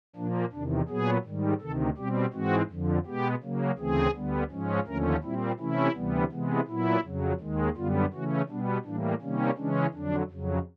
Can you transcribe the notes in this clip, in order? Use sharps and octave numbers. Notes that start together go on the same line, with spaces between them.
A#2 F3 A#3 D4
E2 C3 D#3 D4
A#2 F#3 B3 G#4
G#2 D#3 G3
D2 C3 D#3 A4
B2 G3 C4 G4
G#2 E3 G#3 C4 F#4
F2 D3 F3
B2 G#3 B3 G4
C#3 F#3 A#3
D2 C#3 E3 A3 C4 G#4
D2 D3 G3 B3
G#2 F3 G#3 C#4
D#2 D3 F3 A3 C#4 A#4
A#2 G3 C4 E4
C3 E3 A3 C#4 E4
D2 C3 E3 G3 B3
C3 E3 G#3 B3
A#2 F#3 B3 E4
F2 C#3 F#3
D#2 D#3 G#3
F#2 D3 G3 B3 F4
C#3 E3 A3 C#4 F#4
B2 G3 B3 D4
A2 E3 G3 A#3 D4
C3 D#3 G3 A#3 C#4
C#3 E3 G#3 C#4 D4
F2 D3 F#3 D4
F2 C#3 F#3